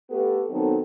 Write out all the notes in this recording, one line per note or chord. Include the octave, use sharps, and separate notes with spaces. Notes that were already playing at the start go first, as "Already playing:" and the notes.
A3 B3 G4 A4
D#3 F#3 B3 C4 D#4 A4